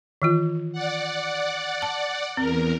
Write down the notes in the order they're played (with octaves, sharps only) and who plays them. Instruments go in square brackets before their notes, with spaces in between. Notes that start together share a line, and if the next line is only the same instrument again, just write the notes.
[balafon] D#3 E3 F4
[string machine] D5 F#5
[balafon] A5
[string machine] E2 A#4 [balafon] C4